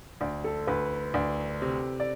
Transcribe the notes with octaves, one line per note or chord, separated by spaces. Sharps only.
D2 D5
A4
D2 B4
D2 D5
C3
D5